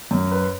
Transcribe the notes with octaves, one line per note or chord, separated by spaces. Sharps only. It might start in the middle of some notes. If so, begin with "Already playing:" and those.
F#2
B4